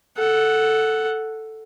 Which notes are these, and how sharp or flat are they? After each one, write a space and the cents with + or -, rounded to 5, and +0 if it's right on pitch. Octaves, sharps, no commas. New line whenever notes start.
A4 +0 F#5 +0